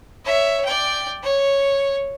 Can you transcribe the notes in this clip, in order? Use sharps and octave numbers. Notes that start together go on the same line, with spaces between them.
C#5 E5
D5 G5
C#5